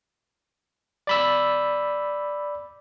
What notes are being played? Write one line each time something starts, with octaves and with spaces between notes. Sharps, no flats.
D5 B5 E6